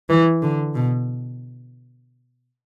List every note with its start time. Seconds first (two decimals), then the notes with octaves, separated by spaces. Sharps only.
0.09 E3
0.42 D3
0.75 B2